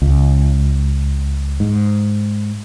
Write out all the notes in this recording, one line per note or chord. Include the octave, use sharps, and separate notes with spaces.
C#2
G#2